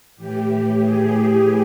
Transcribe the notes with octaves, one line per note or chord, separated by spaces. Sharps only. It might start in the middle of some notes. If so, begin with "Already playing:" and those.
A2 E3 G4
G#4
G4